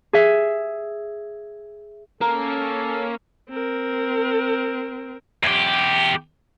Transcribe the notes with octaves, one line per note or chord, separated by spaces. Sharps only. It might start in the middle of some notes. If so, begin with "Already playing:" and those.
G#4 E5
A#3 C#4 A4 A#4
C4 A#4
E2 G4